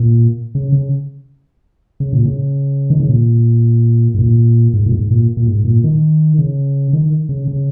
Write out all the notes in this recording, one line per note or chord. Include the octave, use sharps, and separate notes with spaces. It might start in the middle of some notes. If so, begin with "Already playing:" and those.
Already playing: A#2
C#3
C#3
C#3
A#2
C#3
D#3
C#3
A#2
G#2
A#2
G#2
A#2
G#2
A#2
A#2
G#2
A#2
D#3
C#3
D#3
C#3
C#3